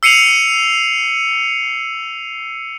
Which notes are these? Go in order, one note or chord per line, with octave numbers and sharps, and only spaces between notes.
E6 C7 C#7 D#7 F7 F#7